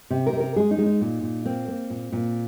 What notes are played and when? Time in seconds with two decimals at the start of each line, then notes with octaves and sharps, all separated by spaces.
0.11 C3
0.27 A#4
0.33 C3
0.40 A#4
0.56 G#3 G#4
0.71 D#4
0.78 G#3
0.86 D#4
1.01 A#2
1.23 A#2
1.45 A#3 C4
1.68 A#3
1.90 A#2
2.12 A#2